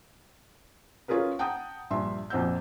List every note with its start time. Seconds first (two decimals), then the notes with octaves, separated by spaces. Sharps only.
1.08 C#4 F4 G#4 A#4 B4
1.39 F#5 G5 A5 A#5 D#6 G6
1.90 A#1 G2 E5 C6
2.30 A#1 F2 C5 F#5 E6 G6